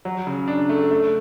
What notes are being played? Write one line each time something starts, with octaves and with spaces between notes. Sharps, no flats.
F#3
C#3
D4
A3
A3